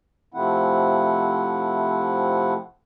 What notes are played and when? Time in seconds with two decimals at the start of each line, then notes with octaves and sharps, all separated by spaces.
0.34 C3 F3 A3 C4 E4 F#5